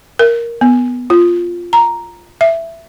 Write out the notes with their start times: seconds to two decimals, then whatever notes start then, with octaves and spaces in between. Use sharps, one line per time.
0.19 A#4
0.61 B3
1.10 F4
1.73 A#5
2.41 E5